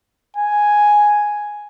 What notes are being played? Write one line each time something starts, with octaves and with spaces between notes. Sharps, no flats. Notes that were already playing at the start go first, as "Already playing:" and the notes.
G#5